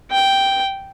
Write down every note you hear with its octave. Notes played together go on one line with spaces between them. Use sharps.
G5